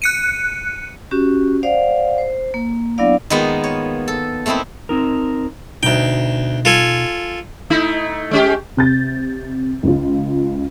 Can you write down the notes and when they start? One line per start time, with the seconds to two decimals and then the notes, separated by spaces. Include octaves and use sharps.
0.02 F#6 C#7 D#7
1.11 C#4 F#4 G4
1.63 C5 D5 F5 F#5
2.18 C5
2.54 A#3
2.98 F#3 B3 D4 E4 D5 F5
3.30 D#3 G#3 A#3 B3 D#4 F4
3.64 C#5
4.08 A4
4.46 A3 A#3 C4 D#4 E4
4.89 C4 D#4 A#4
5.83 D2 B2 D#4 G5
6.65 F4 A4 G#5
7.70 A3 D#4 E4
8.31 G#3 C#4 G4
8.77 C3 G6 A6
9.83 C#2 F4